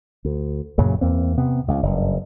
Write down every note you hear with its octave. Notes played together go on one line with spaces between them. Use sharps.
D2
F#2 A#2 C#3 F#3
E2 A#3 C4
C3 B3
C#2
F#1 G2